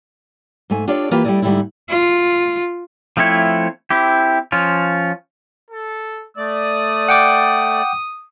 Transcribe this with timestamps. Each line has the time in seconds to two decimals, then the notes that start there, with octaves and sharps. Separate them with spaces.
0.70 G#2 A3 G#5
0.88 D4 F4 G4 A4 C#5 D5
1.11 E3 A#3 F4 G4 B4
1.24 G3 A3 A#3 E4 D5 D#5
1.42 G#2 D3 G3 A3 C4 E4
1.90 F4
3.17 F3 A3 C4 E4 C#5
3.91 C4 E4 G4
4.52 F3 C#4 F4
5.71 A4
6.37 A3 D5 D#6
7.08 F#5 G5 D6